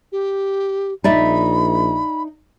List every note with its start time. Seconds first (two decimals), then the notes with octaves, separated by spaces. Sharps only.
0.12 G4
1.04 A#1 D#4 D5 E5 B5